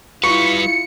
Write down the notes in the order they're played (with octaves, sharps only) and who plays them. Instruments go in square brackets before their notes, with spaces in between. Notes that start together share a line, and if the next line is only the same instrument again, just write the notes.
[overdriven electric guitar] G3 B4 [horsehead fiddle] E4 F4 [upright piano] C#6 [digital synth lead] C#7